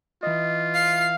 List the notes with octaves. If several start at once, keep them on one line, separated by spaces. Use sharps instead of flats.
E3 F4 D#5
F5 C7